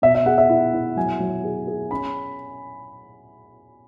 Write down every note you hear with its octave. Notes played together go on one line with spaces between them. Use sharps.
B2 E5
E5
G#4 F#5
E5
E4
E4
F#3 G#5
F#3
G#4
G#4
C#4 B5